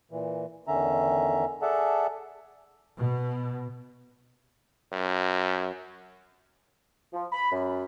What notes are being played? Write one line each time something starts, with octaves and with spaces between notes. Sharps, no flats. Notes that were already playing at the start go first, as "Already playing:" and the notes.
A#2 E3
E2 D3 D#3 C#4 E5 A#5
G#4 A4 D5 E5 F#5 A5
B2
F#2
F3
B5
F#2